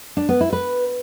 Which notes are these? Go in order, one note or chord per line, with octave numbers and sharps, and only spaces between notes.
D4
B3
E4
B4